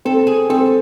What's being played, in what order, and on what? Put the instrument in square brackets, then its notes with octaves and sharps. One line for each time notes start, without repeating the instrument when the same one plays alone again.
[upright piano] C4 [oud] A4
[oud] G#4
[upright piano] C4 [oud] A4